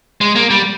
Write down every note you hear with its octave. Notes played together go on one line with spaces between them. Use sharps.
G#3
A#3
G3